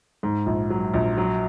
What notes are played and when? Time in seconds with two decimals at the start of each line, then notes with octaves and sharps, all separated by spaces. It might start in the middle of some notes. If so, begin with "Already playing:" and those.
0.23 G#2
0.46 A#1
0.70 F#3
0.94 A#1
1.18 F#3